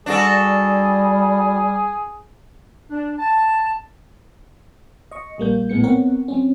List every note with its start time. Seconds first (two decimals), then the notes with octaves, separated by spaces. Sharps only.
0.06 G3 D4 F#4 G#4 A4
2.90 D4
3.18 A5
5.11 D#5 C#6
5.38 A#1 G3 A#3 G6
5.70 A#1 A2 G#3 B3 C#7
5.84 B3 C4 A#4 C#5 F#5
6.28 F#3 C4 C#4